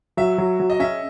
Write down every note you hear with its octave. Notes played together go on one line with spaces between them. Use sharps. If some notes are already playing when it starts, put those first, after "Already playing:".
F#3 E5
F#3
F#3
D#5
C#4 E5